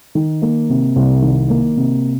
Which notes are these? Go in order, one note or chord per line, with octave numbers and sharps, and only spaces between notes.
D#3
A#3
C3
C2
D#3
A#3
C3